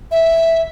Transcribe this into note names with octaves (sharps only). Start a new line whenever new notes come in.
E5